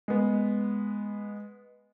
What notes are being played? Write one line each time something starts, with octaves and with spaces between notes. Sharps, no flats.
G#3 B3